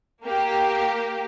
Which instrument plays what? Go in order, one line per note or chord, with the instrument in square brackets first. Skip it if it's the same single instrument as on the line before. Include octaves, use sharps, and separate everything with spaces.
[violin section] A#3 G4